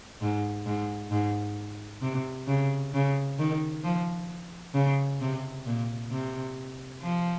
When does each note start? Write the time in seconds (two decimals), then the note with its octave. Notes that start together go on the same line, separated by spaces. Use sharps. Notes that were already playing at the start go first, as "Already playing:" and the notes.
0.21 G#2
0.66 G#2
1.11 G#2
2.02 C3
2.48 C#3
2.94 C#3
3.39 D#3
3.83 F3
4.74 C#3
5.21 C3
5.66 A#2
6.11 C3
7.02 F3